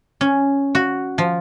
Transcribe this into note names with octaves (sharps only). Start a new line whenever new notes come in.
C#4
F#4
F3